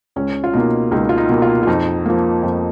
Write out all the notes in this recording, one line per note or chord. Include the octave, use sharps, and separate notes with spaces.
C#2 C#4
F4
B2 A#3 D#4
C#2 D#4
F4
D#4
B2 A#3
F4
F4
F2 D#4
F3 A#3
F2